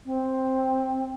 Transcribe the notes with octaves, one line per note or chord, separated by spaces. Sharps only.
C4